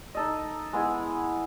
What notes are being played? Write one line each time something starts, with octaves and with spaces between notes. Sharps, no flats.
D#4 A4 D#5
G#3 B3 E4 G#4